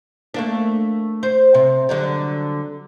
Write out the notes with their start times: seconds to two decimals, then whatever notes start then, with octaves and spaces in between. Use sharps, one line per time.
0.34 A3 A#3 D4
1.23 C5
1.55 C3
1.89 D3 F#3 G3